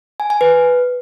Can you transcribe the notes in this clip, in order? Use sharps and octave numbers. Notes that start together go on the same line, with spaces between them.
G#5
G#5
B4